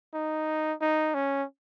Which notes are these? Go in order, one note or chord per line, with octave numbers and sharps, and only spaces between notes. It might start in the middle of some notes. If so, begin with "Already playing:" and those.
D#4
D#4
C#4